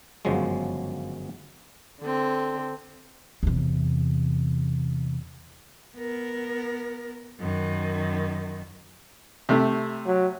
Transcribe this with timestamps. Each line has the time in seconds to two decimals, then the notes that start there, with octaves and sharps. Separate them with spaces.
0.25 G1 F#2 C#3 F3 F#3 G#3
2.02 D3 C4
3.43 E2 C3
5.97 B3 A#4
7.40 F#2 D#3
9.49 C3 A3
10.07 F#3